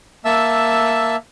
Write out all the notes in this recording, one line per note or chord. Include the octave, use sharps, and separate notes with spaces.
A#3 E5 A5 E6